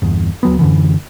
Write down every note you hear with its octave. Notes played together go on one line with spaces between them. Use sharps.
G1 E2
D2 F#3 B3
F#2 D3 E3